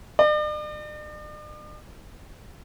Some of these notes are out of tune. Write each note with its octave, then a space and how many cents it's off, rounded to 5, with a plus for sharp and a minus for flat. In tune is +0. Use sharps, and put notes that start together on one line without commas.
D5 +45